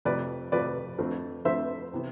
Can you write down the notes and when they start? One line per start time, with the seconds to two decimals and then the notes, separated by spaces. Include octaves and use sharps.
0.05 F2 C3 F3 A3 C4 B4 D5
0.52 F2 C3 F3 A3 C4 B4 D5
0.99 F2 D3 A3 C4
1.45 F2 D3 A3 C4 C5 E5
1.93 C3 E3 B3